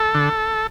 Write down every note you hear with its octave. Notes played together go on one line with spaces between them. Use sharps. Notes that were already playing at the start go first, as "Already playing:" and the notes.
Already playing: A4
D3